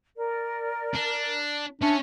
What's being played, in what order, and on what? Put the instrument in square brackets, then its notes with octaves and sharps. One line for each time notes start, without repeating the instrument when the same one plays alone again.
[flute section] A#4 D5
[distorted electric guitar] D4
[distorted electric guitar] C#4 C#5 [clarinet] D4 [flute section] E5